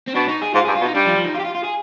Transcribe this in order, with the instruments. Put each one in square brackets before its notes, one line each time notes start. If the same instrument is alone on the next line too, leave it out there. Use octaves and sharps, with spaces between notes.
[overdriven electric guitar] C4
[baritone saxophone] B2 [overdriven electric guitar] D4
[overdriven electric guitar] D#4
G#4
[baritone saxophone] G#2 [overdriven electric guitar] F4
[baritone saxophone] G2 [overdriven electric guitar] G#4
[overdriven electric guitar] F4
[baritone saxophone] B2
[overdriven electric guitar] D#4
[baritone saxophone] G3 [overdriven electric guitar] D4
[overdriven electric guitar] F3
F3
D#4
F4
G4
F4
F4
G#4